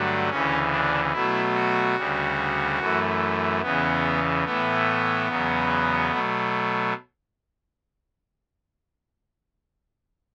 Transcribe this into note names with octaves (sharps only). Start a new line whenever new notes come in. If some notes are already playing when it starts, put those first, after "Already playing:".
Already playing: G2 D3 F#3 A3
D2 C#3 E3 C#4
D4
B2 F#3 A3 E4
F#4
D2 C#3 G3
F#2 E3 A3
E2 C#3 E3 B3
A2 E3 A3 B3
E2 C#3 F#3
B2 F#3 A3